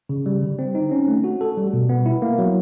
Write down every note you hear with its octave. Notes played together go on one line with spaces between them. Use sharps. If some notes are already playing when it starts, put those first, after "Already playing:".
C#3
G3
D3
C4
D#4
C#4
A3
F#4
A4
G3
B2
B3
E4
A#3
F#3